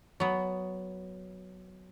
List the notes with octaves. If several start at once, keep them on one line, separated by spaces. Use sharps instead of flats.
F#3 B3